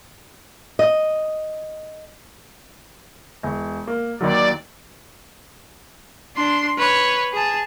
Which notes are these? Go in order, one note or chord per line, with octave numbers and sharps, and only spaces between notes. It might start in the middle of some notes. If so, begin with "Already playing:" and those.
D#5
E1
A#3
D#2 D#3 F#3 D5
D4 C6
B4 C#5
G#4 A5